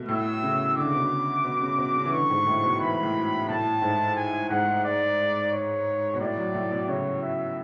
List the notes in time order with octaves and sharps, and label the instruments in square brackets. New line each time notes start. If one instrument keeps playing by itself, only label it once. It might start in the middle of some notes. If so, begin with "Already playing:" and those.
Already playing: [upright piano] B2 A3
[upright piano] A2 [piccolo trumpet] E6
[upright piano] C#3
[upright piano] D3 [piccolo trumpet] D6
[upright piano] C#3
B2
C#3
B2
C#3
B2
C#3
E3
[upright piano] D3 [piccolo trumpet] C#6
[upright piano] G#2
A2
B2
[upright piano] E3 [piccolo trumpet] B5
[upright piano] A2
[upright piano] A2 [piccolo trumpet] A5
[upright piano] G#2
[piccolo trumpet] G#5
[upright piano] G#2 [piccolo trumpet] F#5
[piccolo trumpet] D5
C#5
[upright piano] B2
[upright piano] A2 [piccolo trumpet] D5
[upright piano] F#3
A2
B2
[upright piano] C#3 [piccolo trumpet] C#5
[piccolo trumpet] E5